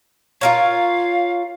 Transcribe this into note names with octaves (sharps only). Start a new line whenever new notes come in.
F4 A#4 C#5 F5